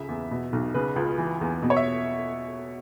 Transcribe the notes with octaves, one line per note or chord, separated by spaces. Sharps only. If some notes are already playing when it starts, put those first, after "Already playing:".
Already playing: C#2 C#3 E5
E2
B2
B1
C#3 B4
C#2
E3
E2
B2
C#5
E5